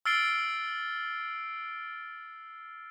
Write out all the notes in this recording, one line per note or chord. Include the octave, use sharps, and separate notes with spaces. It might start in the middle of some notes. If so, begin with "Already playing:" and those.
E6 F6 A6 C7 D7 G7